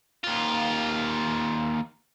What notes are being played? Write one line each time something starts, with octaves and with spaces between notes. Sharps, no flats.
D#2 F4